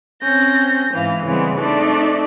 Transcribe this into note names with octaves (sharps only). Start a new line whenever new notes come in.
C4 C#4 G6 A#6
G#2 E3 F5
C#3 E3 G3 G#3 B3 C4
A3 C4 D4 D#4 D5